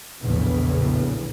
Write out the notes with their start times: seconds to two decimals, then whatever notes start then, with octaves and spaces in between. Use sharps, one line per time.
0.22 A#1 E2 A2 C#3